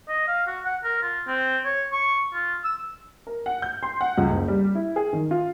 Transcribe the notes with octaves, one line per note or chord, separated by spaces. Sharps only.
D#5
F5
F#4
F#5
A#4
F4
C4
C#5
C#6
F4
E6
A#4
F#5
G6
C6
F#5
C#2
F#1
G3
E4
G#4
D#3
F4